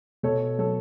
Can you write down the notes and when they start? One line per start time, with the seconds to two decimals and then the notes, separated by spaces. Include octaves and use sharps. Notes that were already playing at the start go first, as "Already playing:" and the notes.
0.23 B2 A4 C#5
0.58 F#3 A4 C#5